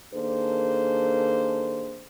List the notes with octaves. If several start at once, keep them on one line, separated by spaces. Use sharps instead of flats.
D#3 A#3 D4 G#4 A4 C5